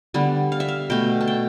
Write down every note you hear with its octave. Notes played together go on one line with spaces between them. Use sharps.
D3 G3 B3
F5
E5
F5
B2 A3 G5
A5
G5